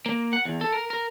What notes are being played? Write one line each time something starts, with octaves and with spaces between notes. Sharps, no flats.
A#3
F#5
E2
A4
A#4
A#4